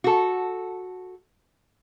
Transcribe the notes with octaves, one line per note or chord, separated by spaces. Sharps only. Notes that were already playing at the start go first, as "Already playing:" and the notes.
F#4 A4